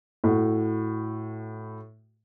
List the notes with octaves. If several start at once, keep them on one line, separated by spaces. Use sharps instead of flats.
A2 F#4